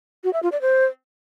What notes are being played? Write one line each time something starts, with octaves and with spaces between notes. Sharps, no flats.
F#4
E5
F4
D5
C5